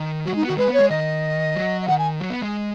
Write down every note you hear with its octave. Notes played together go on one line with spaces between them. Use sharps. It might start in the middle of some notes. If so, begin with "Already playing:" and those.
Already playing: D#3
F#3 F#4
G#3 D#4
B3
D#3 F#4
G#3 B4
B3
C#5
G#3
D#3 D#5
F#3
D#5
D#3 F#5
G#5
F#3
B3
G#3